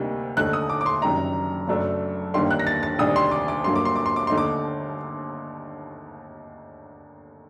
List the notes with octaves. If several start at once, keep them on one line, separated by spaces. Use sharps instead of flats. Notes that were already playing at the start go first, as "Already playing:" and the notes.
Already playing: D2 C3 G3 A#3 D#4
D#2 D3 A3 D#4 F#6
D#6
D6
D6
C6
F#1 F#2 D#3 G3 D4 A#5
F#1 F#2 F#3 A3 D4
G1 G2 D#3 G3 A#3 C6
F#6
A#6
A6
A6
D2 C3 D#3 G3 D4 D#6
C6
D6
D6
G1 G2 F#3 A#3 C6
D6
C6
D6
C6
D6
D#2 D3 A3 D#4 C6
D6